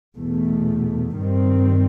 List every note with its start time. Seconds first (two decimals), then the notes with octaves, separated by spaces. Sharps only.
0.17 E2 B2 A3
1.17 G2 D#3 G3 C4